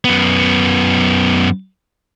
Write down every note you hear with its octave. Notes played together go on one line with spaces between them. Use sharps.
F#2 B3